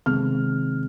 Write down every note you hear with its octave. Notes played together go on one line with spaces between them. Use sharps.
C3 D#3 G#3 C4 F6